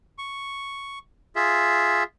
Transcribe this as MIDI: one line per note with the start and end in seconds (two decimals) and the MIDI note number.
0.18 0.99 85
1.36 2.03 65
1.36 2.03 68
1.36 2.03 76